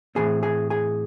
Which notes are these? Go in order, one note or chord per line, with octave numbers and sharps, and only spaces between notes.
A2 E3 G#3 C4 G#4 G#5
G#4 G#5
G#4 G#5